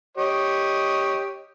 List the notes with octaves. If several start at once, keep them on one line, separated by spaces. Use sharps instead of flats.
G4 C#5 D#5